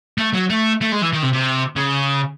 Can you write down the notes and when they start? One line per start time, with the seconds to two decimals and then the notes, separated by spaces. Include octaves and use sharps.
0.18 A3
0.34 F#3
0.50 A3
0.82 A3
0.92 G#3
1.02 E3
1.13 D#3
1.23 C3
1.34 C3
1.76 C#3